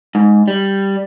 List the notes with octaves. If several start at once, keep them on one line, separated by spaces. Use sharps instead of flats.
G#2
G3